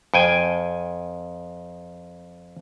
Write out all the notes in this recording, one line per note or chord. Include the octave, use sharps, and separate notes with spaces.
F2 G5 G#5